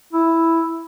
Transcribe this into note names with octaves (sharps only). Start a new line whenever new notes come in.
E4